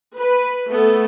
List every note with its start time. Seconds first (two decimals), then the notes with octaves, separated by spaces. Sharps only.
0.17 B4
0.69 A3 B3 A4